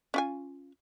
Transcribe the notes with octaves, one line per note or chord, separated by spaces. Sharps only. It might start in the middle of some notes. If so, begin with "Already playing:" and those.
C#4 F4 G#5